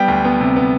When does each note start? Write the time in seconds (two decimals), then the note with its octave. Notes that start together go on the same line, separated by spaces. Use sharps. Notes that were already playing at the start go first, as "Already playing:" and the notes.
Already playing: G3 B3 G5
0.08 D2
0.25 B3
0.40 C3
0.56 B3